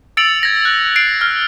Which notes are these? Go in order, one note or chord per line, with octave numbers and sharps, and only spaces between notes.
E6 A6 C#7 D7 F7 F#7
G#6 A#6
F#6
C7 D7
F6